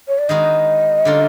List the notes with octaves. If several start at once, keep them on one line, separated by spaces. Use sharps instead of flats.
C#5
D5
D#3 G#3 B3 D#4 F#4 D#5
D3 G3 A#3 C#4 F4